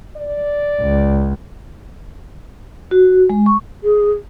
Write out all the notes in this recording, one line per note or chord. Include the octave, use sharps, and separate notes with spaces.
D5
C#2
F#4
G#3
C#6
G#4